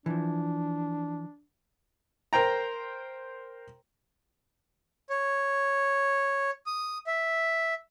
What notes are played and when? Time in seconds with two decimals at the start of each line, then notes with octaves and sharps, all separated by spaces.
0.06 E3 F3 D4
2.33 A#4 C5 G5 A#5
5.10 C#5
6.66 D#6
7.07 E5